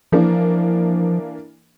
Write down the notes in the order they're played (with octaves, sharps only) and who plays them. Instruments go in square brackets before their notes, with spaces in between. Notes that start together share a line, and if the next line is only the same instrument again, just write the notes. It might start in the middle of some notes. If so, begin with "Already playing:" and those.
[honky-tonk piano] E3 A#3 D4 [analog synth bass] F3